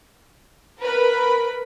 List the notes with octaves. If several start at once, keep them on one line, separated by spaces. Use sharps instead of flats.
A#4 B4 B5